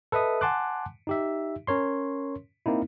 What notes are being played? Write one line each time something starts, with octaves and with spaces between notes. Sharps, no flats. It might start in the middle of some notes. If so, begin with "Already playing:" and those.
A4 B4 D#5 E5 D#6
F#5 G#5 A5 C6 D6 F#6
D#4 G4 E5
C#4 A#4 C#5 C6
A#3 C4 D#4 E4